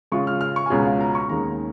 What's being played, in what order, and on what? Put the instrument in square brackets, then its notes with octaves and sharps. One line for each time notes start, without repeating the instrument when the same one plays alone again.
[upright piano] C#3 G#3 C#4 F4 C#6
F6
F6
C#6
G#5
C#2 B2 G#3 C#4 F4 A#5
F5
A#5
C#6
D#2 D#3 G#3 C#4 A#5